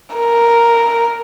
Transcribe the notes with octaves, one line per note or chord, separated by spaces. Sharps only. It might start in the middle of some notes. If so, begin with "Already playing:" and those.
A#4